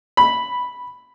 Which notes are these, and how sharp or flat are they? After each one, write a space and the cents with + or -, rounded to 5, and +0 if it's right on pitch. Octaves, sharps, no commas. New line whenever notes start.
B5 -5